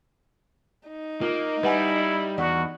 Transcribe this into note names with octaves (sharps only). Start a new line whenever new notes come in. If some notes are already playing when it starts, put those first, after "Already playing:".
D#4
A#3 F4
G3 E4 B4 F#5 G#5
E2 F#4 D5